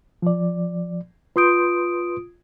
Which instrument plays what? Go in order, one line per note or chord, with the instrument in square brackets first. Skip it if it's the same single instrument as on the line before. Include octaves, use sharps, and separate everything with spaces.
[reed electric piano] F3 D5
[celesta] F4 D#6 D7 [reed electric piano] B4 C6 G6